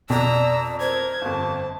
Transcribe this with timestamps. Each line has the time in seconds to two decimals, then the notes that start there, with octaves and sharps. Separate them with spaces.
0.10 F2 B2 D5 A#5 E6
0.80 A#4 C5 G#6
1.22 G1 F2 A5